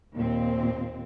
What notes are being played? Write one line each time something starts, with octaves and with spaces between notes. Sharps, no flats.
D#2 A#2 C4